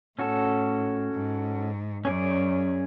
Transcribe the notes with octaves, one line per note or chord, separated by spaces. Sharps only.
A2 C#4 F#4 A4
G#2
F#2 C#4 G#4 D5